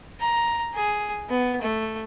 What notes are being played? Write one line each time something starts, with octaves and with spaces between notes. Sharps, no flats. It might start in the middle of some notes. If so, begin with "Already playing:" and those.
A#5
G#4
B3
A3